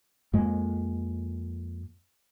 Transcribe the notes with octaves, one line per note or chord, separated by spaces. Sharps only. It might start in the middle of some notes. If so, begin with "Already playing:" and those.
F2 G#3 A#3